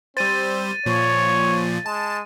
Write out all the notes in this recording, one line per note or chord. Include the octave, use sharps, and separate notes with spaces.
G3 C4 C5 A6 D#7
A#2 F3 C#5
G#3 A5